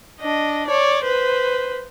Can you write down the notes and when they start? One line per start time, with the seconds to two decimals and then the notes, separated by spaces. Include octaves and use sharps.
0.21 D4 D#5
0.68 C#5 D5
1.04 B4 C5